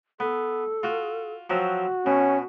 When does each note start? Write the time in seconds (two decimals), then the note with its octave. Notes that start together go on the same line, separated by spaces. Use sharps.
0.20 B3 A4
0.83 F4 F#4
1.50 F3 F#3 C4 F#4
2.06 B2 C#4